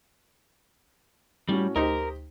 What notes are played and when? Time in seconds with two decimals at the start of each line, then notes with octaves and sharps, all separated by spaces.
1.49 A2 G3 C#4 F#4
1.76 D2 D#4 G4 A#4 C5 D#5